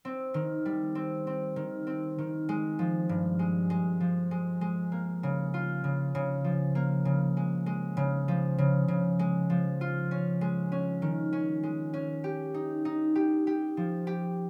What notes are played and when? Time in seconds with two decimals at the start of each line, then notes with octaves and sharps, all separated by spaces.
0.05 C4
0.34 D#3
0.65 G3
0.95 C4
1.27 C4
1.56 D#3
1.87 C4
2.18 D#3
2.49 G#3
2.79 F3
3.09 G2
3.39 G#3
3.70 G#3
4.00 F3
4.31 G#3
4.61 G#3
4.92 A#3
5.23 C#3
5.54 F4
5.84 C#3
6.15 C#3
6.44 F3
6.75 A#3
7.05 C#3
7.37 G#3
7.66 G#3
7.97 C#3
8.28 F3
8.58 C#3
8.88 C#3
9.19 G#3
9.50 F3
9.81 F4
10.11 C#4
10.41 G#3
10.72 C#4
11.02 D#3
11.33 C#4
11.63 G#3
11.94 C#4
12.24 G4
12.54 D#4
12.85 D#4
13.15 G4
13.47 G4
13.77 F3
14.07 G4